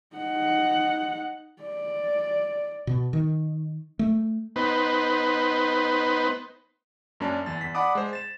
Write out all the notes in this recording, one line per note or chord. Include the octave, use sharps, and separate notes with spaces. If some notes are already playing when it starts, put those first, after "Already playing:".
D#4 F#5
D5
B2
D#3
A3
B3 D#4 B4 C5
F#2 A#3 C#4 D4 A5
E2 A6
E2 B6
D5 F#5 A5 B5 D6 D#6
G#3 C5
A6 E7